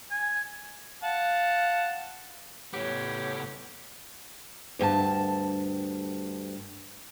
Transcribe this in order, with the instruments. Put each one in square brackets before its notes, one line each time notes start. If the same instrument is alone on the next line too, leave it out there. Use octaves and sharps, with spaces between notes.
[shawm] G#5
[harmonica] F5 F#5 A5
[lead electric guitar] A2 B3 [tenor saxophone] G4 [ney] C#5
[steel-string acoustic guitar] D2 G2 G#5 A5